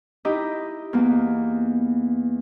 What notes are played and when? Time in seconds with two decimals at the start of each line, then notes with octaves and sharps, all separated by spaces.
0.25 D#4 E4 G4 D#5
0.93 E2 A#3 B3